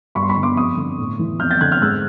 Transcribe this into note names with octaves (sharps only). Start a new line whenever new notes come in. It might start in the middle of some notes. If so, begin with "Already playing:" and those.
G2 B5 C#6
C6
B5 C#6
D3
C6 D6
F2 C#6 D#6
D3
A2
E3
F2 F6 G6
G6 A6
D3 F#6 G#6
F6 G6
G#2 E6 F#6